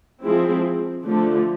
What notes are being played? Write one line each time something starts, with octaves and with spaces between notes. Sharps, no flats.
F3 G#3 C4 E4 G#4
D3 F3 A3